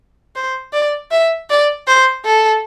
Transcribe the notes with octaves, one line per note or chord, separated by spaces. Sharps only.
C5
D5
E5
D5
C5
A4